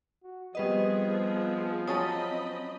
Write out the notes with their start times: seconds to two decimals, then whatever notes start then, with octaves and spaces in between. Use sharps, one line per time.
0.24 F#4
0.55 F3 G3 B3 C4 G#4 B4 D#5
1.88 F#3 C4 C#4 D#5 A5 B5 D#6